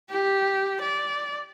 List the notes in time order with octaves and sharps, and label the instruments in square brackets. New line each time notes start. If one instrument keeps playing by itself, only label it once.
[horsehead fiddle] G4
D5